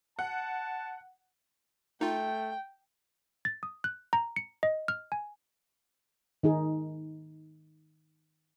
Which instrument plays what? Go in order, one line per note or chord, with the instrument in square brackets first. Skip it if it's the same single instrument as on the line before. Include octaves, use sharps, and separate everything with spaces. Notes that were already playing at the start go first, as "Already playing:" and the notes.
[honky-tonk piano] F#5 [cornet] A5
[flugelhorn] A3 [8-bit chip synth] D#4 F4 [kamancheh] G5
[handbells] A6
D#6
F#6
A#5
C#7
D#5
F6
G#5
[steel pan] D#3 D#4 G#4